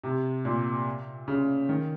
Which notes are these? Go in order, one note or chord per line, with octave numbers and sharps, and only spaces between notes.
C3
A#2
C#3
D#3